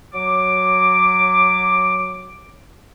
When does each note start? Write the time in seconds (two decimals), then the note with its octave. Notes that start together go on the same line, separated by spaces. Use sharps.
0.14 F#3 D6